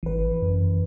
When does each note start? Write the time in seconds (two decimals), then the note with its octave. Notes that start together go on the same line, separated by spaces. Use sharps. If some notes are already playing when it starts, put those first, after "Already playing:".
0.03 G#1 E3 B4
0.41 F#2